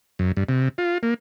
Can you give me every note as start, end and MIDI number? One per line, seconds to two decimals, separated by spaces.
0.19 0.32 42
0.37 0.44 43
0.49 0.69 48
0.78 0.98 65
1.03 1.14 58